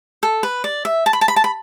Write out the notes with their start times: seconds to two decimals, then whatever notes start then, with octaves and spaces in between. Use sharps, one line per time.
0.23 A4
0.43 B4
0.64 D5
0.85 E5
1.06 A5
1.13 B5
1.21 A5
1.28 B5
1.36 A5
1.44 B5